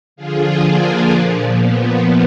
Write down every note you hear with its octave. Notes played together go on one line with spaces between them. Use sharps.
D3 F3 F4 G#4
A#3 D4
A#2 F3
B3